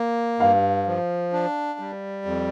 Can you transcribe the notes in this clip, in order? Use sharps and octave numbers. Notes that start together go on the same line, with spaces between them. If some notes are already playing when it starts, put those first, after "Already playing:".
Already playing: A#3
G2 F5
F3
D4
G3
F2